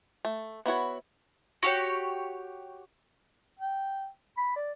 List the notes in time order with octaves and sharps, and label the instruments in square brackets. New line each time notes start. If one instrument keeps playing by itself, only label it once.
[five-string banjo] A3
B3 E4 F#4 C#5
[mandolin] F#4 G4 C#5
[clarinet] G5
B5
D5